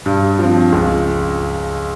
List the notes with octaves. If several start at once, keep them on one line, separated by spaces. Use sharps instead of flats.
G2
F3 C4
C#2